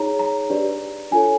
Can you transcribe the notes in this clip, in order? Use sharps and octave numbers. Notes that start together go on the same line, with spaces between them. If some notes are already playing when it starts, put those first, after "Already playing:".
Already playing: D#4 G#4 C#5 A#5
A#5
D4 G4 B4 D5
D4 F4 A4 C#5 G#5